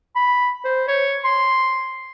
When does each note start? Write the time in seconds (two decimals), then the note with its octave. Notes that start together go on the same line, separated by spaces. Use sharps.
0.16 B5
0.65 C5
0.88 C#5
1.24 C6